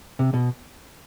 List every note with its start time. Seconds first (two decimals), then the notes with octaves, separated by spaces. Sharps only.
0.19 C3
0.34 B2